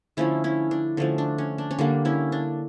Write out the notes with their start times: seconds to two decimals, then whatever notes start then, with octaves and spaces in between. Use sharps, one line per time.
0.17 D3 F3 A3 C#4 E4
0.44 C#4 E4
0.71 D4
0.97 D3 F3 A3 C#4
1.18 D4
1.38 C#4
1.58 D4
1.71 C#4
1.79 D3 G3 A#3 D4
2.05 C#4 E4
2.32 D4